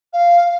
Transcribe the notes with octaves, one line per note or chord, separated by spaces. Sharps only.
F5